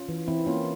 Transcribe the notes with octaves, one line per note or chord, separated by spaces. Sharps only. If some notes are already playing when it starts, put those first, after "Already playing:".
Already playing: C#4 F4
E3
E3 C4 E4
A#3 C#4 F4